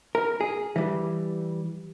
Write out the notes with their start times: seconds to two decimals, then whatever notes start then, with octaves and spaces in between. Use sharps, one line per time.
0.15 A#4
0.40 G#4
0.76 E3 G3